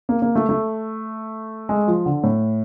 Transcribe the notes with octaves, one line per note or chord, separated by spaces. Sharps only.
A#3
A#3
A3
A3
G#3
F3
D3
A2